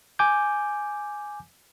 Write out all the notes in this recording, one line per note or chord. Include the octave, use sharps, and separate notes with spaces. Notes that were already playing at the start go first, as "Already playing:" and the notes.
G#5 D6 G6